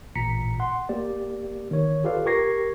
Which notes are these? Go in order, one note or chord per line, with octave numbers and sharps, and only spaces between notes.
A1 A#2 A#5 B6 C#7
F#5 C6
A#3 G4 D5
D#3 C#5
F4 G4 A4 B4 D5 F5
G4 A#4 C#6 G#6 A#6 C7